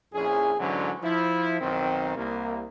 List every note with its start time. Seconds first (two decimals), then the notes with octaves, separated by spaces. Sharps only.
0.13 A#1 F2 C#4 E4 G#4
0.59 D2 G#2 D3 E3 F#3 C#4
1.03 F3 E4
1.61 B1 D#3 C4
2.16 C2 A#3